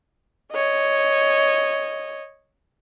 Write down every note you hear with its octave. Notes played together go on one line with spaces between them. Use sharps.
C#5 D#5